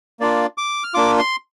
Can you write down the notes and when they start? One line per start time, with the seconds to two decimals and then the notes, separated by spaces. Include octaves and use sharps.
0.20 A#3 D4 F4 D5
0.58 D6
0.84 F6
0.94 A#3 D4 F4 D6
1.19 C6